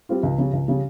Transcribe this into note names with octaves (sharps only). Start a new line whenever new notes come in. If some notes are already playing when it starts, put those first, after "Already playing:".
G3 C4 F4
C#2
C#3 G3
C#2
C#3 G3